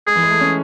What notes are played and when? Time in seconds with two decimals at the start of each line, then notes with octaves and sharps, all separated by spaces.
0.07 G#3 G#4
0.15 E3
0.23 G#3
0.31 A3
0.40 C#4